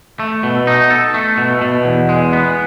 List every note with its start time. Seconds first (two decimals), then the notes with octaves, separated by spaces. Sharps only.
0.20 A3
0.43 B2
0.67 D#4
0.90 A4
1.14 A3
1.38 B2
1.62 B2
1.85 E2
2.09 G#3
2.33 B3